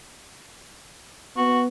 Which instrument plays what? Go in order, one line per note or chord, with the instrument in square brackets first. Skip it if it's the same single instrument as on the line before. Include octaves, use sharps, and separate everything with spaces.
[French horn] B3 [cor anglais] F#4